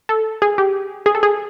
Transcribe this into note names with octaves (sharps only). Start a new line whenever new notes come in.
A4
G#4
G4
G#4
A4
G#4